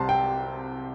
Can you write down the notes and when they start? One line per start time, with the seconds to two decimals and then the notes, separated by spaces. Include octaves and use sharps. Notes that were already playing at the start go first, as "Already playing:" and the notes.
Already playing: C2 C3 A5 C6
0.09 G5